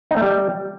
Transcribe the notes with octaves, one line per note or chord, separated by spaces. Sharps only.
D#4
A3
G3